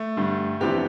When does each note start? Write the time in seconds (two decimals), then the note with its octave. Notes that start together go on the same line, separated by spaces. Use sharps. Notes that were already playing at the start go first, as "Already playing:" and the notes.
Already playing: A3
0.17 G2 D3 G3
0.60 F2 C3 E3 B3 D4 G4